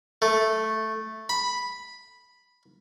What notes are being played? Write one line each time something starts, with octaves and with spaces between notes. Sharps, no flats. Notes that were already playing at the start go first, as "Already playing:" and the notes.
A3
B5